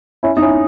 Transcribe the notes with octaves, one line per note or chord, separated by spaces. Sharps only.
C#4 E4
D#4
C#4 E4